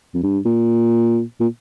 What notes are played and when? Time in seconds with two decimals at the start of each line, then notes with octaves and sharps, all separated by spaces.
0.14 F2
0.23 G2
0.45 A#2
1.40 A#2